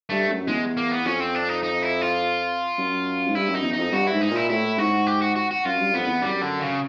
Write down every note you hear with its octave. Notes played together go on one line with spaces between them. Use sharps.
G2 A3
F#2
E2 G#3
A#3
B3
F2 C#4
C4
D4
D#4
D#4
E4
F4
F#2
G#2
G2 E4
F#2
D#4
E2
D#4
F2
G2 F#4
E4
G#2
D#4
A#2 E4
A2 E4
G#2 F#4
G4
F#4
F#4
F#4
F#2 F4
G2
F2 B3
E2
F#2 G3
D3
C#3